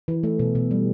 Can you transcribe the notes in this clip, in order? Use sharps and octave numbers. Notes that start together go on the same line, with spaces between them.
E3
A3
B2
B2
G3